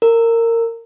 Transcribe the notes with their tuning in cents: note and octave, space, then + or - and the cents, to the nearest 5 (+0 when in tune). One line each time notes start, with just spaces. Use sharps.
A#4 -20